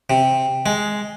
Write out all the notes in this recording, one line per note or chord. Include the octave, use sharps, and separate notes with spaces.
C3
G#3